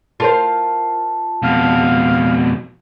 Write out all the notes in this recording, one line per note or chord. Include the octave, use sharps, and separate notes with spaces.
F4 A#4 C5 A5
F2 B2 F5